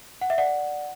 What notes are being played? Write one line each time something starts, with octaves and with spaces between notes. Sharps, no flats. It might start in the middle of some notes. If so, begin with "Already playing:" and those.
F#5
E5
D5 F#5